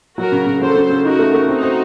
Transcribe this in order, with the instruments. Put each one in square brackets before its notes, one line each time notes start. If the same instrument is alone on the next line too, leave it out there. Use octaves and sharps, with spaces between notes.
[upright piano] F#3 [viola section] F#4 A#4
[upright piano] C#3
C#3
[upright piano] F#3 [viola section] A4 C5
[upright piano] C#3
C#3
[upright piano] D#4 [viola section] F#4 A#4
[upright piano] A3
A3
[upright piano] C4 [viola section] D#4 F#4
[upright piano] C5